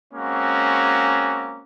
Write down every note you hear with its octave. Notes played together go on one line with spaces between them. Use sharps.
G#3 A#3 C4 C#4 F#4